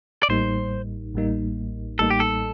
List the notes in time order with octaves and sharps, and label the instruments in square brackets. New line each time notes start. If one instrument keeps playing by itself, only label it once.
[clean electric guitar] D5
[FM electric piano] A1 A2 G3 A#3 D#4 [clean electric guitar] C5
[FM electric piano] A1 A2 G3 A#3 D#4
[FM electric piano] A1 A2 G3 A#3 D#4 [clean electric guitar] A4
[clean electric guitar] G4
A4